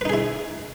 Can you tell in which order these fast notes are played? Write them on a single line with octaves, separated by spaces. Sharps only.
B4 D#4 G#4 E4